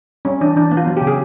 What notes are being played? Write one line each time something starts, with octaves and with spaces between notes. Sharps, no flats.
G3 C#4
E3 D4
E3 D4
B3
F4
F#3
G4
C#3
G#4